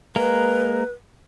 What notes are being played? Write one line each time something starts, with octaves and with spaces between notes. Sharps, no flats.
G#3 A#3 A#4 B4